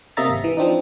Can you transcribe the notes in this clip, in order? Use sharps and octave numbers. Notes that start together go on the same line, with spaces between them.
C3 A#3 D#5 E5 A#5 A6
G#1
E3
F3 C4 D4 D#4